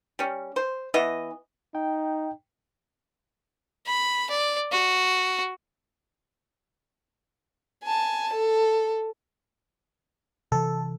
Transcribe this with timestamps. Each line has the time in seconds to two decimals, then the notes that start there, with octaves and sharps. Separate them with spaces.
0.19 G3 C#4
0.56 C5
0.94 E3 B3 D#5
1.75 D#4 G5
3.86 B5
4.30 D5
4.71 F#4
7.84 G#5 A5
8.34 A4
10.52 C3 E3 A4